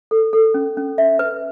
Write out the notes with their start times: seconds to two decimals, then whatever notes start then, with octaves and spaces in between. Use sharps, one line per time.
0.11 A4
0.33 A4
0.54 C#4
0.77 C#4
0.98 E5
1.19 B4